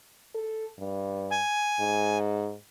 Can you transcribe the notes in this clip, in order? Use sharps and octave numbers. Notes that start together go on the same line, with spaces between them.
A4
G2
G#5
G#2